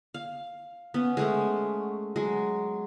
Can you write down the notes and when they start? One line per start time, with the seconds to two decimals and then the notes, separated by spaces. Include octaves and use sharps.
0.14 F5
0.94 B3 C#4 F#5
1.17 G#3 A3 C#4
2.16 F#3 G#3